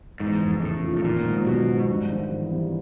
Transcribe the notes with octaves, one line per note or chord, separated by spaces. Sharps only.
E2 G#2
F1
A2 C#3
F3
A2
A#2 D#3
G#2
B2 F#3
G#2
G2
G#1
E3
G3